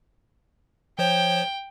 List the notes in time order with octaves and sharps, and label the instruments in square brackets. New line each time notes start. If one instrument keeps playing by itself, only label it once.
[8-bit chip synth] F3 C5 C#5 [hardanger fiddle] G5